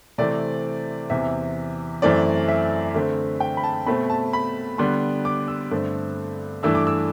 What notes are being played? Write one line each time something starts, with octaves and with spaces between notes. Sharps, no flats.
C3 E3 A3 C4 D5
E2 C3 E3 E5
F#2 E3 A3 C4 D5
E5
D3 A3 C4
G5
B5
A5
B2 A3 C4 B5
A5
B5
D3 G3 B3 C6
D6
E6
G2 D3 A3 C4
G2 E3 A3 D4 E6
D6
E6